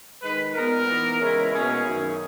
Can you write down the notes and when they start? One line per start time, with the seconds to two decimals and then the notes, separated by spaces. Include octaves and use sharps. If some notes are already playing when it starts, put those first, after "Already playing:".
0.22 D#3 G#3 D#4 B4
0.54 A#2 G#3 B3 A#4
0.87 E3 B3 D#4
1.20 C#3 E3 G#3 C#4 E4
1.52 B2 A#3 C#4 E4 G#4
1.85 F#2 D#3 F#3 C#4